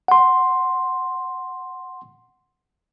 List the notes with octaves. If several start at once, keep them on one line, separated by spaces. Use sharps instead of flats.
F#5 C6